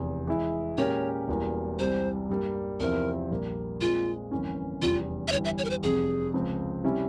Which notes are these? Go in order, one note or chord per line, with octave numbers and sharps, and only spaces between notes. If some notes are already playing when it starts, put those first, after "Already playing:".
Already playing: F1 E2 C3 E3
E3 G#3 E4 G#4
A#2 G#3 C#4 G4 A#4 C#5
E1 E2 E3 G3 A#3
C2 C3 E3 G3 C5
G2 G3 A#3
E2 C3 F3 C4 E4 A#4
A#1 A#2 G3 A#3
A#2 G#3 C4 F4
G1 F2 E3 A#3 C#4
F1 E2 E3 G3 C#4 F4
E5
G1 G2 E3 G3 C#5
E5
C#5
A#4
C5
F1 F2 C3 G#4
C#2 C#3 F3 C4
C3 G3 C#4 E4